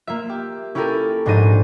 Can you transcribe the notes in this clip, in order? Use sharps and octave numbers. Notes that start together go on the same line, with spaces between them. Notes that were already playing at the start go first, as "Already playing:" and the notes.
A#3 F4 E5
G4
C#4 E4 F4 G4 A4 A#4
A#1 G#2 D4 C5 A#6 D#7